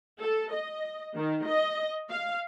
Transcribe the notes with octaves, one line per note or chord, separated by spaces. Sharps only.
A4
D#5
D#3
D#5
F5